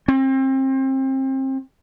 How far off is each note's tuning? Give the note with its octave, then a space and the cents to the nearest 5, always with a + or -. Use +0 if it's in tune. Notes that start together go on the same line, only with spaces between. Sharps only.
C4 +30